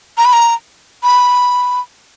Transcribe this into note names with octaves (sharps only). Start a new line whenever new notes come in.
A#5
B5
A#5
B5